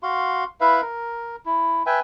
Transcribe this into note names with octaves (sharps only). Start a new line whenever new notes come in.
F#4 F5 C6
E4 B4 E5 F5
A#4
E4
B4 E5 G5 G#5